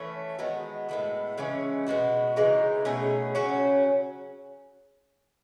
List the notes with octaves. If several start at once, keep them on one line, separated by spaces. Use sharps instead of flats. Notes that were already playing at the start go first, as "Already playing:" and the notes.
Already playing: E3 A3 C#4
D#3 G#3 B3 F#4
A2 G#3 B3 E4
C#3 E3 G#3 C#4
B2 G#3 B3 F#4
C#3 E3 G#3 D#4
B2 A3 C#4 G#4
C#3 F#3 C#4 F#4